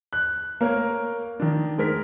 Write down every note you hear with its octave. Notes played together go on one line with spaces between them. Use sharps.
F#6
A#3 A#4 C#5
D#3 D4
G#3 A#4 B6